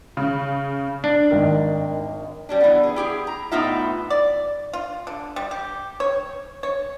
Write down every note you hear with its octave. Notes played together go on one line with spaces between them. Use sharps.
C#3
D4
G#1 D#3 A#4
G3 C#4 D4
E3 B3
G#4
E4 G4 G#4
A#5
A2 B3 D#4 F4 E5
D5
F4
D3
G3
G4
C#5
C#5